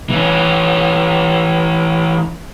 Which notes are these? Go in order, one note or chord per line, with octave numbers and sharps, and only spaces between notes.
E3 C#4